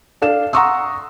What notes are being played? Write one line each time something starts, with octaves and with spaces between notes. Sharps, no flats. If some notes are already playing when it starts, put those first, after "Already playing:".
D4 A4 F5 E7
F#5 A#5 C6 C#6 D#6 E6